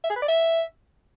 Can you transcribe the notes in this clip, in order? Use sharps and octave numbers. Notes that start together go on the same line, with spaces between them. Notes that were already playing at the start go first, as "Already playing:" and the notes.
E5
G#4
B4
D5
E5